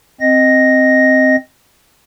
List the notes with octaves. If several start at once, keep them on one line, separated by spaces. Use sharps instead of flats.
C4 D#5 A#6